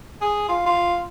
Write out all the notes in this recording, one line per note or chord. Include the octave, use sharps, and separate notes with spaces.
G#4
F4
F4